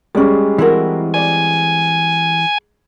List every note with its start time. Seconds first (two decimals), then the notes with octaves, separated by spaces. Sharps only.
0.15 G3 G#3 C#4 G#4 D5
0.58 E3 C4 E4 F#4 A#4
1.14 D5 G#5